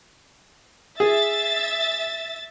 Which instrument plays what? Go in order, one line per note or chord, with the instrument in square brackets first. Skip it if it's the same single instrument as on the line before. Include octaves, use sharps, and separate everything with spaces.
[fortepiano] G#4 [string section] E5 A6